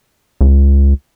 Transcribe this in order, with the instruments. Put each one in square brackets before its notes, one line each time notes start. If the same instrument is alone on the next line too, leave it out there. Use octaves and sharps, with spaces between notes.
[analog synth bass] C#2